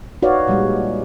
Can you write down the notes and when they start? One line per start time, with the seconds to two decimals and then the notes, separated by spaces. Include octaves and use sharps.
0.22 D#4 F#4 B4 C#5 D5 F5
0.47 A#2 G3 G#3